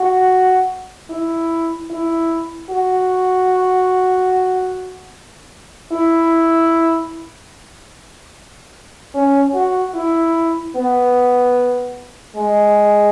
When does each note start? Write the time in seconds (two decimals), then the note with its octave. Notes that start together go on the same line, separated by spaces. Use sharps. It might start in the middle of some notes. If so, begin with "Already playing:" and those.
Already playing: F#4
1.10 E4
1.91 E4
2.70 F#4
5.93 E4
9.14 C#4
9.54 F#4
9.95 E4
10.76 B3
12.36 G#3